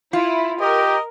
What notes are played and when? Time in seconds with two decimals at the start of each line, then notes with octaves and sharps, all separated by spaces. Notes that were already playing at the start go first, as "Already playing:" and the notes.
0.13 E4 F4
0.61 G4 A#4 D#5